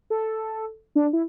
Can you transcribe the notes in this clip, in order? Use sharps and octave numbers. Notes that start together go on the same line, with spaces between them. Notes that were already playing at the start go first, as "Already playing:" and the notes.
A4
D4
E4